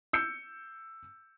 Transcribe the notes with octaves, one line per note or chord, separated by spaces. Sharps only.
E6 G6 C#7